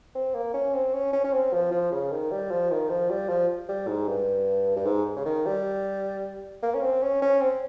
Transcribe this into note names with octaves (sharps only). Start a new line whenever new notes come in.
C4
A#3
C#4
C4
C#4
C#4
C#4
C4
F3
F3
C#3
D#3
G3
F3
D#3
F3
G3
F3
G3
G#2
G2
G2
G#2
C#3
D#3
G3
A#3
C#4
C4
C#4
C#4
C4